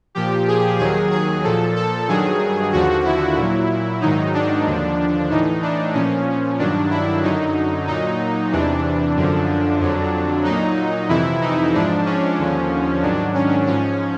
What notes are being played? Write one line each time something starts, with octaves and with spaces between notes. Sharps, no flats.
A#2 F3 G4
G#4
D#2 D#3 F#3 G#4
G#4
A#2 F3 A4
A4
G2 D#3 F#3 G#4
D#2 D3 F3 F#4
E4
A#2 F#3
G#2 D#3 F#3 D#4
D4
D#2 D3 F3
A2 E3 D#4
D4
A#2 F3 C#4
G2 D#3 F#3 D4
E4
F#2 D3 F#3 D#4
A#2 F#3 D#4
E2 C3 E3 D4
F#2 D3 F3
F2 D3 F#3
A#2 F#3 D#4
F2 C3 E3 E4
D#4
G#2 F3 D4
C#4
D#2 D3 F3
G#2 D#3 F#3 D4
C#4
G#2 F3 C#4